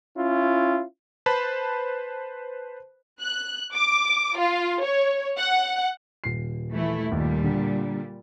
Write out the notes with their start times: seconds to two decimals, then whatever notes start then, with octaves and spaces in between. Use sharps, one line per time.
0.17 C#4 E4 F4
1.26 B4 C5 A5 B5
3.21 F#6
3.73 D6
4.37 F4
4.83 C#5
5.39 F#5
6.24 D#1 C7
6.71 E3 A3 E4
7.12 D#2 A#2 G3
7.44 D3